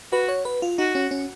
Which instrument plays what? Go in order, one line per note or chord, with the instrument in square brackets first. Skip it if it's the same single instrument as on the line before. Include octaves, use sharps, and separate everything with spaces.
[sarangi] F#4 [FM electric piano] B4
[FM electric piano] C#5
B4
F4
[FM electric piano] D#4 [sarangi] F#4
[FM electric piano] C#4
C#4